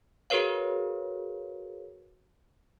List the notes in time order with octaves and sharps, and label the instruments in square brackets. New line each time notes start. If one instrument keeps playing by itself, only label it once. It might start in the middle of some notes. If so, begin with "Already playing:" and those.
[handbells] F#4 G#4 A#4 B4 C#5 F5